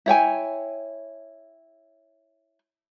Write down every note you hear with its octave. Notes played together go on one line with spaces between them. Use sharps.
E4 C#5 G5 G#5